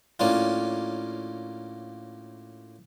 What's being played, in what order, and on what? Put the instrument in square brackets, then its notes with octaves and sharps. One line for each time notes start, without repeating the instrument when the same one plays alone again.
[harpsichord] A2 A#3 C#4 D4 F4